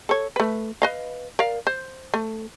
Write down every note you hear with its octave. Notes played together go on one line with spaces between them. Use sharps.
A4 C#5
A3 B4
B4 D#5 F5
A#4 D5 F5
C5
A3